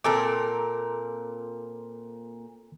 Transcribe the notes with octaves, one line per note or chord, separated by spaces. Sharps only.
A#2 C4 A4 A#4 D6